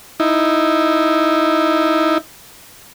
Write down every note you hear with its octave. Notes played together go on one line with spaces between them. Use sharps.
D#4 E4